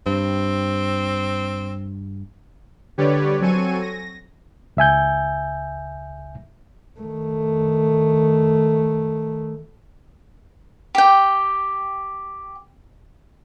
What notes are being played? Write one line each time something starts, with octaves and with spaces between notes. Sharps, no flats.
G2 C4
D3 G3 G4 B4 C#5 D5
F#3 C4 A4 G#5 C#6 D#7
A#6
C#2 E5 G#5 G6
D#3 A3
G4 G5